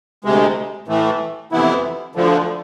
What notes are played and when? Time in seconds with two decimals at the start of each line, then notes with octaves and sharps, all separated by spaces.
0.24 D2 C3 G#3
0.88 A2 E3 A3
1.52 F2 C3 E3 B3 E4
2.15 D2 D3 F3